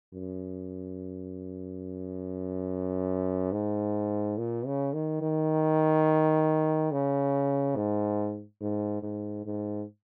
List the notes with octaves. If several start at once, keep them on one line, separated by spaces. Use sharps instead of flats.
F#2
G#2
A#2
C#3
D#3
D#3
C#3
G#2
G#2
G#2
G#2